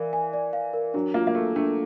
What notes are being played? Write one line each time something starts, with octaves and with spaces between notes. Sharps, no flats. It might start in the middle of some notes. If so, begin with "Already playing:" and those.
Already playing: E3 A#4 D5 F5
G#5
D5
F5
A#4
F#3 D4
A#3 F4
A#3
A3 A4
A3 D4